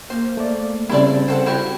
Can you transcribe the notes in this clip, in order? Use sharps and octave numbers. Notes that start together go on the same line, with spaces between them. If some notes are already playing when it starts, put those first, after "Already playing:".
A#3 C5
A3 D5
C#3 G3 C4 E4 A4 D5
C4 A4 C5 F#5
E4 F#4 G4